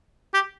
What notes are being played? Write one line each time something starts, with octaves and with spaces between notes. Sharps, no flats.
G4